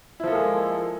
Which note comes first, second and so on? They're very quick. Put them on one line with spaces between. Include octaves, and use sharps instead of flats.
E4 F3 A4 A#3 G#3